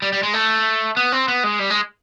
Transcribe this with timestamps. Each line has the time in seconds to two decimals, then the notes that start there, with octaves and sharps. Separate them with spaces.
0.02 G3
0.13 G3
0.23 G#3
0.33 A3
0.97 B3
1.12 C4
1.28 B3
1.44 G#3
1.59 G3
1.70 G#3